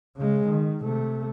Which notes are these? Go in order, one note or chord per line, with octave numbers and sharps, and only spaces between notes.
C#3 G#3
D#3
C3 A3